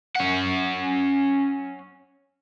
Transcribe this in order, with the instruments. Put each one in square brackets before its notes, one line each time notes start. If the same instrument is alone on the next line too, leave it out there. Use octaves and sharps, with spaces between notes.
[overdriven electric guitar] C#4 F#5